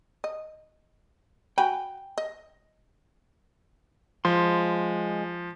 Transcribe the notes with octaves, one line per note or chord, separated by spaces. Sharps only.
D#5
F#4 G5 G#5 B5
D#5
F3 G#3 C6